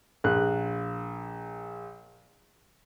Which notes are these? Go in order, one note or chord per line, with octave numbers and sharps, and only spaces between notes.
A#1 F#6